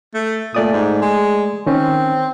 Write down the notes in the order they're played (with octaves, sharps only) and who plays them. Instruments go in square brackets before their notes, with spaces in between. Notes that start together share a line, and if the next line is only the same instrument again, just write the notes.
[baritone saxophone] A3
[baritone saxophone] A#2 [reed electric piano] A3 D5 D#6
[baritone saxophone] G#2
G#3
[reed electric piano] D#3 C#4 [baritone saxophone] C4